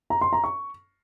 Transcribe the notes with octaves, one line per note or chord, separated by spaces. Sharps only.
A#5
C6
A#5
C#6